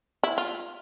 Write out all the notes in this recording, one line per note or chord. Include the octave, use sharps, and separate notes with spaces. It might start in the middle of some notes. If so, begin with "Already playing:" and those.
E4
F4